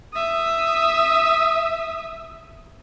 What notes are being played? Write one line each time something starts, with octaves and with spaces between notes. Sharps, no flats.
E5 D#6